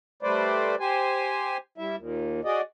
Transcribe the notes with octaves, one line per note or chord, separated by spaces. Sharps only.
G3 A3 B4 C5 D5
G4 C5 G#5
G3 E4 E5
D#2 A#2
F#4 G#4 D5 D#5